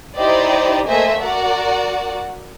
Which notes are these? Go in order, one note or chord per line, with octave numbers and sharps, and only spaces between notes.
D#4 E4 G4 C5 D5 D#5
A3 A#3 C5 D#5 E5 G#5
F#4 A#4 D5 F#5